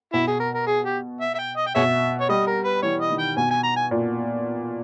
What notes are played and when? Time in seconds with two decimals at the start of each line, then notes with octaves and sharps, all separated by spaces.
0.13 B2 E4
0.27 G#4
0.40 A#4
0.55 A#4
0.67 G#4
0.85 G4
1.21 E5
1.35 E5
1.39 G5
1.57 D#5
1.67 G5
1.75 B2 G#4 C#5 E5
2.21 C#5
2.29 G3 D#5
2.47 A#4
2.65 B4
2.82 E3 C#5
3.01 D#5
3.10 D#3
3.19 G5
3.37 B2 G#5
3.51 G#5
3.64 A#5
3.77 G#5
3.91 A#2